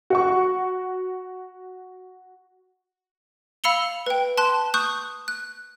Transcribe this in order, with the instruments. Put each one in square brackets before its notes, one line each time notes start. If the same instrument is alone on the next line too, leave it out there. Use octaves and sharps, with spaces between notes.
[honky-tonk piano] F#4 F#5 C#6
[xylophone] F5 B5 E6 C#7 F7 G7
B4 G5
A5 C6 F#6
C#6 D#6 F#6 G6
F#6